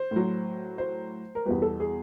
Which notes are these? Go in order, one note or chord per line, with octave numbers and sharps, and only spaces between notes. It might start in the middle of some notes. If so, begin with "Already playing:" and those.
Already playing: C5
A2 F#3
C5
A#4
E2 B2 G3 B4
A4
G#4